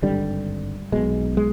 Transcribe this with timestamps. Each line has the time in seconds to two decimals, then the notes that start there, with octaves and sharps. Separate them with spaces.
0.02 G#1 G2 D3 G3
0.92 B1 B2 G#3
1.37 G#3